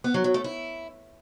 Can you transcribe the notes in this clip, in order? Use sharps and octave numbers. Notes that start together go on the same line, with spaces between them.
B3
F#3
F#3
A3
E4